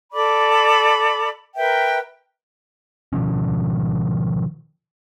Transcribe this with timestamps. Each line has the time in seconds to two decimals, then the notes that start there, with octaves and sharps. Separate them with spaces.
0.13 A4 D5 B5 D6
1.56 A#4 B4 E5 G5
3.13 B2 D#3 F3 C#4